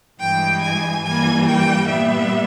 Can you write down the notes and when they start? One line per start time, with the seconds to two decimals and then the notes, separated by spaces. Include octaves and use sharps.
0.20 G2 E3 G#3 G5
0.62 G#5
1.04 G2 E3 G3 A#3 G#5
1.46 G5
1.88 A#2 G3 B3 E5